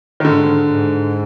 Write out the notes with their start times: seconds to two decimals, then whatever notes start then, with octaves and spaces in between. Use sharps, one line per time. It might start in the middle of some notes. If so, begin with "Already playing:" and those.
0.20 D#3
0.24 G#2 D3
0.71 G#2